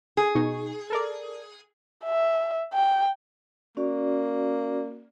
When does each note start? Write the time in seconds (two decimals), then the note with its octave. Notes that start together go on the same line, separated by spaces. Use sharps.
0.17 G#4
0.35 B2 D#4 C#6
0.90 A4 A#4 D5
2.04 E5
2.73 G5
3.77 A#3 C#4 F#4 D5